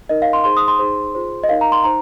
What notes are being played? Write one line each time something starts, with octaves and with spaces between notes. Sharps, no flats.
D#4 A#4 D#5
F5
C6
D#4 G#4 C5 C6
D#6
C6
D#4 G#4 C5
F4 G#4 C5
D#5
D#4 A#4 F5
A#5
C6
D#4 C5 A#5